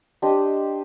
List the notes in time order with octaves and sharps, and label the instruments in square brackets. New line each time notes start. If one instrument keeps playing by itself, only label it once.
[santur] D4 G4 C5 D#5